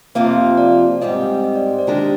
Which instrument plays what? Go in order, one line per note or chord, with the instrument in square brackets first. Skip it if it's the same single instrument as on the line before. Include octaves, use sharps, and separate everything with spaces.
[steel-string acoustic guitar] F2 C3 F3 A#3 F4 [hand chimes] C5
[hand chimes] D5
[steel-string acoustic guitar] G#2 G3 C4 G4 [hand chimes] D#5
[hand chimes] D#5
D5
C5
D5
[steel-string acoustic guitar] D#3 G#3 D4 G4 A#4